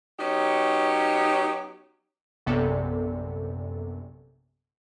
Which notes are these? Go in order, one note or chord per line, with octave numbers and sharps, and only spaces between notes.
F#3 B3 C#4 D#4 G4
A#1 F#2 C3 B3 A4 D5